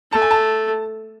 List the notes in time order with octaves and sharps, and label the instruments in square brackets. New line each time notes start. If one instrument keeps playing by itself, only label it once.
[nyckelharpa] A3 [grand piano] A5
[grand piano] G#5
A5